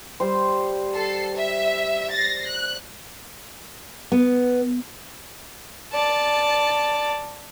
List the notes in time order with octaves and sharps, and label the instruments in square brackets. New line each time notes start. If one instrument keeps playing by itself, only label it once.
[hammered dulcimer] G3 C5
[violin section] A4 C7
E5
A6 A#6 C7
F#6
[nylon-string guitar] B3
[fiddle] D5 A5